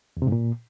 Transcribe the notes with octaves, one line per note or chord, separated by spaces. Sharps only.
E2
C3
G#2
A#2